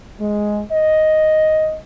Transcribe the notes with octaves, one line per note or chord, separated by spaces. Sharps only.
G#3
D#5